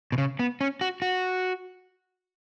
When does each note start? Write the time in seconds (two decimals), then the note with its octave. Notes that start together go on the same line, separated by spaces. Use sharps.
0.12 B2
0.18 C#3
0.39 B3
0.61 C#4
0.81 F#4
1.02 F#4